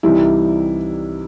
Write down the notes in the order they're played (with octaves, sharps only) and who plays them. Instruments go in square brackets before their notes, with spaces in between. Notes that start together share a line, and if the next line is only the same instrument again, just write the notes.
[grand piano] C2 C3 E3 G3 D#4 [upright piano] E4